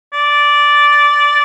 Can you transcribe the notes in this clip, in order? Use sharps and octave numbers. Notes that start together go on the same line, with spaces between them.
D5